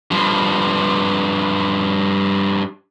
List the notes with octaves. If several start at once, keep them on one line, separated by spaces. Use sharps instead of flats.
G2 F3